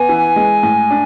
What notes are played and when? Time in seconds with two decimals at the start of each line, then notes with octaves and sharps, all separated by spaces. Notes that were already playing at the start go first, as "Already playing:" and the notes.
Already playing: B3 G#5
0.09 E3
0.36 G#3
0.63 A2
0.90 D4